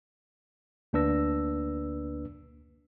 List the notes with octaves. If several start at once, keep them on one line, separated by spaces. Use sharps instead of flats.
D2 A#3 D4 B4 E6 A#6